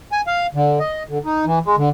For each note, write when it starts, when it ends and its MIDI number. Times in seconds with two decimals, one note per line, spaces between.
0.12 0.21 80
0.27 0.47 77
0.55 0.79 50
0.79 1.03 75
1.09 1.19 50
1.25 1.45 63
1.46 1.59 52
1.66 1.76 56
1.77 1.89 50